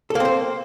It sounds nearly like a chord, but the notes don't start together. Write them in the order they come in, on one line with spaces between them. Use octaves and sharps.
A4 A#3 C4 C5